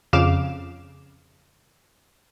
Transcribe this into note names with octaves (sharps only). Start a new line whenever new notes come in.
F2 C#3 F5 D6 E7